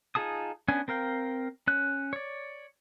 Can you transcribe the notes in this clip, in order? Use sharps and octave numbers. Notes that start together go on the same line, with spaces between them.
D#4 F4 G#4 A5 D#6
B3 C#4 D4 G#5
C4 A#4 F5 G5
C#4 F#6
C#5 D5